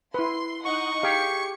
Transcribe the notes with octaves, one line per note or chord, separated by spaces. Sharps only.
E4 B4 C6
D#4 D#5 F#5 C#6
G4 G#4 F5 G5 C#7